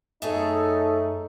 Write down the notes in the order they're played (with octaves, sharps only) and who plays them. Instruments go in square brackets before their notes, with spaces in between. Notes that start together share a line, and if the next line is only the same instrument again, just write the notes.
[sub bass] F#2 [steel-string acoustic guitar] A3 G#4 C#5 [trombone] D#4 [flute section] A4